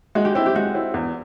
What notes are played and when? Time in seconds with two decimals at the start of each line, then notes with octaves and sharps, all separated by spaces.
0.15 G#3 F#4
0.25 G4
0.35 C4 E4 G4
0.46 G4
0.55 G#3 F#4
0.74 C4 E4
0.94 E2